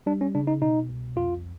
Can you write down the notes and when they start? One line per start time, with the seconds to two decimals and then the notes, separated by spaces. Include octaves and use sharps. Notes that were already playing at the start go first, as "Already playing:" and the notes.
0.06 G3 D4
0.21 C#4
0.35 C#3 D4
0.47 D#4
0.61 B2 D#4
0.89 C2
1.16 F2 F4